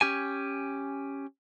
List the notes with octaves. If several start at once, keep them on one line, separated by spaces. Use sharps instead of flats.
C#4 G4 G#5